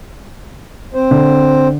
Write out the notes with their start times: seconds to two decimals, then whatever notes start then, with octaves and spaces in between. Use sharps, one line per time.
0.94 C4 C5
1.11 D3